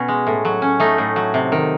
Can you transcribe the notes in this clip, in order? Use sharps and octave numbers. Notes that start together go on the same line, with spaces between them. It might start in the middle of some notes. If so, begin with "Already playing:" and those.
Already playing: B2 C#4
G#3
A2
F#3
C#4
A3 D#4
A2
F#3
C3
D#3